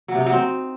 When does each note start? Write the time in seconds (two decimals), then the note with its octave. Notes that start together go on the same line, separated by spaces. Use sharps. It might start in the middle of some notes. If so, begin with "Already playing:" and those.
0.08 F#3
0.14 C3
0.20 D#4
0.26 F#3
0.32 C4